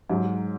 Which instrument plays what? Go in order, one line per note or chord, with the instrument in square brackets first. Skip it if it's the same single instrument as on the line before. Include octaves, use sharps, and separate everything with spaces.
[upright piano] G#2 [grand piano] F#3